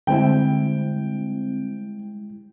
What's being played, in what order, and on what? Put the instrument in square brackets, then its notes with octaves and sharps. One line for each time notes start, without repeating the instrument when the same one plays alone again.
[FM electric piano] D3 C4 [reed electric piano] G3 G#3 E4 [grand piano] G5